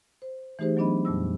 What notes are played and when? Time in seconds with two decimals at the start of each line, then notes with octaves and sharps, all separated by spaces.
0.22 C5
0.59 E3 A3 D#4 G4 G#4 C5
0.77 F#3 B3 D4 D#5 B5
1.05 F2 A#2 G3 E6